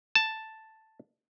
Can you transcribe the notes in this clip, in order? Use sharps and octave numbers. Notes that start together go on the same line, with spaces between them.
A5